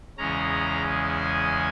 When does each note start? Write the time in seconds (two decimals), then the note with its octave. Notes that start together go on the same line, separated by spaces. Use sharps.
0.18 E2 C#3 G#3 C#4 A#5
1.11 G#5